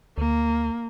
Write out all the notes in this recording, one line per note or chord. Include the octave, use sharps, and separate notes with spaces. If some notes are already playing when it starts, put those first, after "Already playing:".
D2 A#3